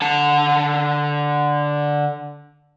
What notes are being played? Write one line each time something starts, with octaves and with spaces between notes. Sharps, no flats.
D3 A5